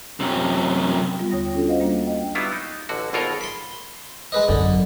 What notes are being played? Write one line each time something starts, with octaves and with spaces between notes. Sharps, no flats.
F#2 C3
G3 B3 F4
D#2 D3 C#5 G5 D#6 A#6
C#4 D4 F4 F#4 A4
F#4 C5 D#5 F5 F#5
G3 A#3 D4
D#5 G5
F#3 G3 B3 E4 F4
D#4
A1 D3 F#4
G#1 B2 F4 A4 A#4 C#5
B5 C6
G#3 B4 D#5
G#1 F#2 D3